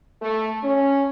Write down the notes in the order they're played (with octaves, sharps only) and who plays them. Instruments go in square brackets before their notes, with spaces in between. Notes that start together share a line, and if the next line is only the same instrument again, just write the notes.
[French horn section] A3
C#4